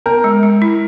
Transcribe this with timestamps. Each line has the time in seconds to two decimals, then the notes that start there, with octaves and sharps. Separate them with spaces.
0.06 B3 A#4
0.24 G#3
0.43 G#3
0.62 E4